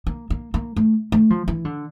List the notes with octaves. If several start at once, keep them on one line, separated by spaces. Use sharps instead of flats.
A#3
A#3
A#3
A3
A3
F3
E3
D3